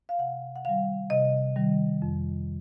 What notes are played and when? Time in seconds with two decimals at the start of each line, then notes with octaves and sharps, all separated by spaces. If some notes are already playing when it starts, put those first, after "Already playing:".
0.09 F5
0.19 C3 F#5
0.56 F#5
0.65 D#3 G3 F5
1.10 C3 D#5
1.56 D#3 G3
2.02 F2